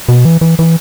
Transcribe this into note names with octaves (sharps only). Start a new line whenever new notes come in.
B2
E3
E3
E3